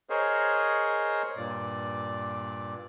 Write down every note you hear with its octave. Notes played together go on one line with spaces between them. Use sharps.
G#4 A#4 C5 C#5 D#5
G2 A#2 D5